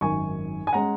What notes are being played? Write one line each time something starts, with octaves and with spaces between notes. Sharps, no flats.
G#1 F#2 D#3 G#5 C#6
G#5
G#3 C#4 F#5 A#5